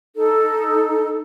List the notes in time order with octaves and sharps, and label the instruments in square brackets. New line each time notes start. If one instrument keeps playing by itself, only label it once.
[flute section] D#4 A4